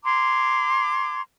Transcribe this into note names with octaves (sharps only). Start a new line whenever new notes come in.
A#5 C6 D6 G#6